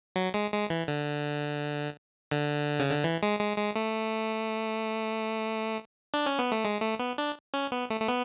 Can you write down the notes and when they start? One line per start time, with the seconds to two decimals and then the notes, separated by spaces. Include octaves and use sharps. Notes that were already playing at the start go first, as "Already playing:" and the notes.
0.16 F#3
0.34 G#3
0.53 G#3
0.70 E3
0.88 D3
2.31 D3
2.79 C#3
2.91 D3
3.04 E3
3.23 G#3
3.41 G#3
3.58 G#3
3.75 A3
6.14 D4
6.26 C#4
6.39 B3
6.52 A3
6.65 G#3
6.82 A3
6.99 B3
7.18 D4
7.54 C#4
7.72 B3
7.90 A3
8.01 A3
8.09 B3